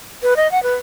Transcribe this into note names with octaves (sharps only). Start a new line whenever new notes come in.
B4
D#5
F#5
B4